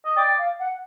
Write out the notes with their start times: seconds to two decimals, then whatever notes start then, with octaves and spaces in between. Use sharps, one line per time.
0.05 D#5
0.17 D5 G5
0.38 F5
0.60 F#5